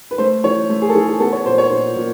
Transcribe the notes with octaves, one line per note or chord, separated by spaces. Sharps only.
B4
A3 C5
E3 C#5
A3
G#4
A4
E3 G#4
G#4
B3 A4
C#5
A#2 C5
C#5
A#2 C5
A#2